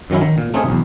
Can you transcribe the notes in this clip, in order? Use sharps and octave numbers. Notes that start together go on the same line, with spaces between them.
F#2 D#3 F#3 C#4 E4
D#3
A#2
A3 C4 C#4 D#4 F4 G#4
B1 E2